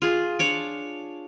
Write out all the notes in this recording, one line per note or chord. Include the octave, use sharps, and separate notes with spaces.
F4 G#4
D4 C#5 D6